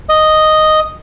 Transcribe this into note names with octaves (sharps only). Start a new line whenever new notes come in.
D#5